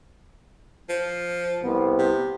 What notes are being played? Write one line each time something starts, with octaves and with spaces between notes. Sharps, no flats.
F3
C2 B3
C3